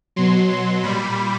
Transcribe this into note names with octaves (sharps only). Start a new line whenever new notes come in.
B2 F#3 C6
C6
A#2 G3 B5